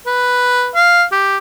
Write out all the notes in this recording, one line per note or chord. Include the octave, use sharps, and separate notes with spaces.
B4
F5
G4